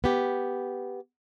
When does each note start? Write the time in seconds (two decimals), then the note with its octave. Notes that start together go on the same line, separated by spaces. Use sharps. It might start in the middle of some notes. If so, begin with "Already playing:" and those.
0.04 B3 G4